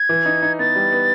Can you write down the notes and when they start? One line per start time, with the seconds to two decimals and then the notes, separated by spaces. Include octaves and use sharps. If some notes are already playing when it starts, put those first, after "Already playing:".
Already playing: G#6
0.09 E3
0.26 D#4
0.42 D#4
0.59 B3 A6
0.76 G3
0.92 B3